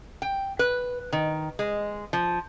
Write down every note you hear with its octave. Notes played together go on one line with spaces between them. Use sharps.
G5
B4
D#3
G#3
F3